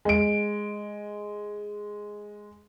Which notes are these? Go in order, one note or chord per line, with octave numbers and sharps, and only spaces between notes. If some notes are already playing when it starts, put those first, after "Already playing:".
G#3 D7